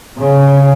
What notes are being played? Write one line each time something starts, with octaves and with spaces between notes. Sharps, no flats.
C#3